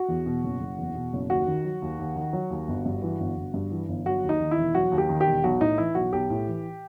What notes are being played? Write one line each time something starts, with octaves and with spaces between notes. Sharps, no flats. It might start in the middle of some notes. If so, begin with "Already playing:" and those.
Already playing: F#4
E2
B2
F#1
F#1
E2
B2
F#1
D#2 F#4
D#3
F#3
D#2
D#2
D#3
F#3
D#2
G1
G2
E3
G1
G1
G2
E3
G1
F#3 F#4
D#2
D#4
D#3
E4
E1
F#3 F#4
D#2
G4
D#3
G4
E1
B1 F#4
A2 D#4
E3 E4
B1 F#4
B1 G4
A2
E3